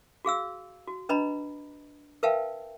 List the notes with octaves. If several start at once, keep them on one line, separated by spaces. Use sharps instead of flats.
F#4 G#4 F5 E6
F#4
D4 B4 D#5 A#5 B5
A#4 B4 E5 F5 G5 A5